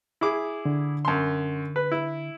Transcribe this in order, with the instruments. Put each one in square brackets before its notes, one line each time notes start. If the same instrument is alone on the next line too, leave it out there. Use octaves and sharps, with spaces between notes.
[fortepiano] E4 G#4 D6
[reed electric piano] D3
[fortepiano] F#2 C6
B4
E4